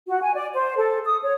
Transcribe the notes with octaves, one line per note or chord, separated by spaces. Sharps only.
F#4
G#5
D5
C5
A4
D#6
C#5